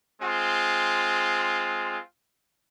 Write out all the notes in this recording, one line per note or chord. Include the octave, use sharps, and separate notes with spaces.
G#3 C4 F4